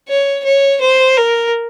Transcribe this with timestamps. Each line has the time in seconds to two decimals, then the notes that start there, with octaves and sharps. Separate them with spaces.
0.09 C#5
0.44 C#5
0.81 C5
1.17 A#4